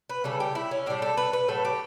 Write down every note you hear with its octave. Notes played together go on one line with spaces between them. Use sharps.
B4
C#3 G3 A4
G4
E4
C#4
A2 G3 D4
A4
B4
B4
A2 F#3 A3 A4
G4